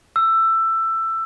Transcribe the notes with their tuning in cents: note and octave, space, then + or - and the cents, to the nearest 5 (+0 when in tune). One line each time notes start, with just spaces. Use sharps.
E6 +15